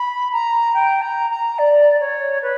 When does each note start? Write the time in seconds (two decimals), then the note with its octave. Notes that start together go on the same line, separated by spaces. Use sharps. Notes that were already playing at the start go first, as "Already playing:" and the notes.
Already playing: B5
0.32 A#5
0.73 G5
1.01 A#5
1.30 A#5
1.58 D5
2.00 C#5
2.42 B4